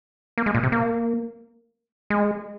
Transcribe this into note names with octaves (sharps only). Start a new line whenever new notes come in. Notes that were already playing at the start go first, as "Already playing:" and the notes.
A#3
G#3
A#2
C3
A#3
G#3